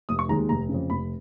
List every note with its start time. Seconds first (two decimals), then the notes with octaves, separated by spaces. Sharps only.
0.09 F1 D#6
0.19 C#6
0.29 D#2 D#3 G#3 A#5
0.49 F1 A#5
0.69 F2 C#3
0.90 F1 B5